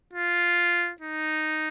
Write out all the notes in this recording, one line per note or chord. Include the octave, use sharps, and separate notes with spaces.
F4
D#4